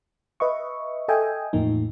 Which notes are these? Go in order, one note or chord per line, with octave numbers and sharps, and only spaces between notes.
B4 D#5 E5 C#6
A4 D#5 E5 G5 G#5
E2 A2 F3 A#3 D#4